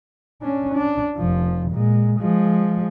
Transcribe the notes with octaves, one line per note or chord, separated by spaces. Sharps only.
C#4 D4
D4
F1 F3
A#2 G#3
F3 G#3